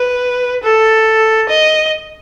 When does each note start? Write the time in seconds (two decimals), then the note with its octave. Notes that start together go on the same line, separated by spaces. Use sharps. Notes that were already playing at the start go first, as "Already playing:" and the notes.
Already playing: B4
0.63 A4
1.49 D#5